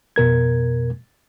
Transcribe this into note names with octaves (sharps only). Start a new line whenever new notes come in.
F2 B2 A#4 G#6